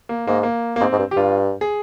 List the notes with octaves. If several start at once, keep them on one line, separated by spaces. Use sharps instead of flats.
A#3
G#2 A#3
A#3
A#3
G#2 C4
G#2
G2
G4
G2 F4
G#4